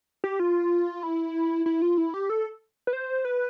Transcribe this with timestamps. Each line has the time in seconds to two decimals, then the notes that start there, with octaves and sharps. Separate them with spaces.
0.24 G4
0.40 F4
1.03 E4
1.66 E4
1.82 F4
1.98 E4
2.14 G4
2.30 A4
2.87 B4
2.93 C5
3.25 B4